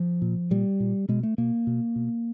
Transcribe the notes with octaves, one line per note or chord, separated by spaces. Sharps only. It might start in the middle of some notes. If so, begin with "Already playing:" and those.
Already playing: F3
A#2
A#2 G3
A#2
B2 G#3
A3
B2 A#3
B2
B2